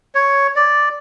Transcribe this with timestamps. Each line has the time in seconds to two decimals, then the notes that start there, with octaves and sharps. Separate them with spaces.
0.15 C#5
0.56 D5